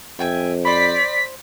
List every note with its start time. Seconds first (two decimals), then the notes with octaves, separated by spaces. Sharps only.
0.19 F2 E5 G5 G#5
0.65 C5 D5 B5 B6